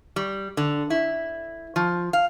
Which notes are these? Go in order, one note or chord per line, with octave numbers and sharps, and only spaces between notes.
G3
D3
E4
F3
F5